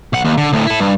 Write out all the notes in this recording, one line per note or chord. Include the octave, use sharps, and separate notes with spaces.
B1 F#5
D#2
D3
D2 A2
E4 A4
G2